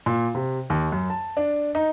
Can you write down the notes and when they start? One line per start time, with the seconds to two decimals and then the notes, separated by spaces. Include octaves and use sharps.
0.06 A#2
0.35 C3
0.70 D#2
0.92 F#2
1.10 A5
1.37 D4
1.75 D#4